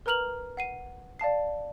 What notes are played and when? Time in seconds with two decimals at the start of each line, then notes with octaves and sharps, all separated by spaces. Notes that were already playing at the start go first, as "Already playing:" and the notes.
0.06 A#4 B4 A#5 F6 F7 F#7
0.57 F#5 C7 D#7
1.19 D5 F5 A5 C7